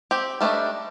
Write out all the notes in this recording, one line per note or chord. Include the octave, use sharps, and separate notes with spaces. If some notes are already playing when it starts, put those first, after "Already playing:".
C4 G4
G3 A3 B3 D4 D#4